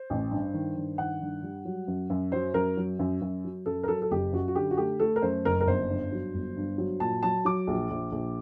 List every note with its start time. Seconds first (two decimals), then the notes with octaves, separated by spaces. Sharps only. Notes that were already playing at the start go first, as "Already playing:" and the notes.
Already playing: C5
0.10 A1
0.31 G2
0.54 D#3
0.76 G2
0.98 D#3 F#5
1.22 G2
1.43 G3
1.65 F#3
1.88 F#2
2.10 F#2
2.32 F#3 C5
2.54 F#2 A#4
2.77 F#3
2.99 F#2
3.21 F#2
3.45 F#3
3.66 F#2 A4
3.83 A#4
3.88 F#3 A4
4.02 A4
4.11 F#1 G4
4.33 F#2 F#4
4.48 F#4
4.55 D3 G4
4.71 F#4
4.77 A3 G4
5.00 A3 A4
5.16 A#4
5.22 F#2 C5
5.45 F#1 A#4
5.61 A#4
5.66 G1 C5
5.90 G2
6.12 F#3
6.34 G1
6.57 G2
6.78 F#3
7.00 A#2 A5
7.23 F#3 A5
7.45 F#3 D6
7.67 A#1
7.91 A#1
8.12 A#1